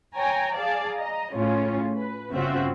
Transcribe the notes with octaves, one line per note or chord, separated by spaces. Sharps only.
C#5 G5 G#5 A#5
G#4 D5 F5 A5
D#5 A#5
A2 C#3 C#4 F4
B4
G1 C#3 C4 F4 F#4 E5